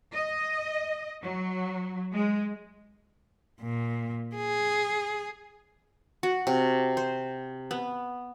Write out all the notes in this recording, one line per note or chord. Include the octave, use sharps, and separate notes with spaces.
D#5
F#3
G#3
A#2
G#4
F#4
C3
C5
B3